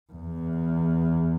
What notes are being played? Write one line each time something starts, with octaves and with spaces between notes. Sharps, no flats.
E2